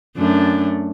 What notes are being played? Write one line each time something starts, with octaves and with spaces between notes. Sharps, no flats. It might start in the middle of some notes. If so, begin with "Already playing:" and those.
F#2 A3 D4